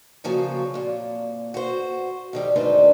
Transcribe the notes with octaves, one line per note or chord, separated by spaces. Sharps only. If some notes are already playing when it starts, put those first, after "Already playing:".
C#3 F3 F#3 A#3 C#4
F2 A#2
F#4 C5
F2 D#3 G3
D2 G#2 D4 D#4 B4 C5